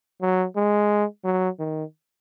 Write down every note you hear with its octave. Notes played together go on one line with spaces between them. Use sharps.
F#3
G#3
F#3
D#3